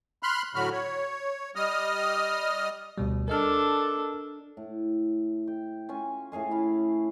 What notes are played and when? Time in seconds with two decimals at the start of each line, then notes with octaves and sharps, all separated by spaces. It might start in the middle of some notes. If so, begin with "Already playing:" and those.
0.23 B5 C6 F6 F#6
0.55 A2 D3 F#3 F#4 B5 F6
0.72 C#5
1.56 G3 D#5 D#6 F6
2.98 D2 B2 G3
3.28 D4 A4 A#4 D#5 F6
4.57 A2
5.47 G5
5.89 C#4 F4 G#5
6.32 A2 G#4 F5 G#5
6.51 E4 F5 B5